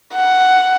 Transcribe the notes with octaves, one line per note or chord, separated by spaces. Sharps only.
F#5